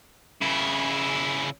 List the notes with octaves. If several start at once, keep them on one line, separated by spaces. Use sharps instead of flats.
C#3 E4